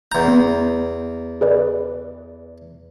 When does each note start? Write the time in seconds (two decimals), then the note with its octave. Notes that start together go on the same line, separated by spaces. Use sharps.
0.12 E2 A#5 G6
0.28 B3
1.41 G#4 B4 D5